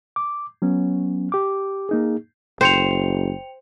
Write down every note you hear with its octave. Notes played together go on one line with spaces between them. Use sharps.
D6
F#3 B3 C#4
G4 D6
A#3 D#4 G#4
F#1 C5 G5 C#7 F7